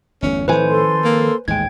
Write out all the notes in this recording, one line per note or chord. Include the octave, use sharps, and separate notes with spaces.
G1 E2 A3 C#4
A2 D#3 F3 C4 B4 C5 G#5
A4 C6
A#3
A1 D#2 G#2 G#3 G5 G#6